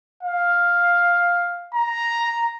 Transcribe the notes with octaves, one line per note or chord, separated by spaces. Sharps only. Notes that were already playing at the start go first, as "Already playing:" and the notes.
F5
A#5